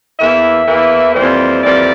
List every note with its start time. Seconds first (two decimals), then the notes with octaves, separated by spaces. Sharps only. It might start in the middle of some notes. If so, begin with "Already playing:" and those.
0.17 E2 E3 A#3 E5
0.66 E2 E3 A#3
1.14 F2 E3 G3 A#3 C5
1.62 F2 E3 G3 A#3 D5